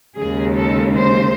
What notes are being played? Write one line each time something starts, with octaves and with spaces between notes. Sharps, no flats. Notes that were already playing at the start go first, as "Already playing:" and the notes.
D#2 C#3 G#3 G#4
A4
C5